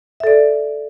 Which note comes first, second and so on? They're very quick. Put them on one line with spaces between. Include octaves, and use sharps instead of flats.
E5 A4 D5